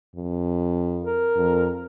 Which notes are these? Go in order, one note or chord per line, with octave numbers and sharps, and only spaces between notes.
F2
A#4
F2